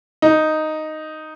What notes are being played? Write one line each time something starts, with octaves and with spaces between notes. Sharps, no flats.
D#4